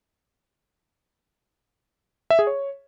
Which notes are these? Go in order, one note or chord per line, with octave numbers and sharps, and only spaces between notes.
E5
G#4
C#5